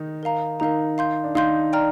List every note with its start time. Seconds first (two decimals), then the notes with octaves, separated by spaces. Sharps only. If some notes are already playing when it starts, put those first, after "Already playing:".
Already playing: D#3 D#4
0.23 A#4 F5 A#5
0.60 D#3 D#4 A#4 F5 A#5
0.98 F5 C6 G6
1.24 D4
1.35 D#3 D#4 F5 C6 G6
1.73 D5 G5 A#5 F6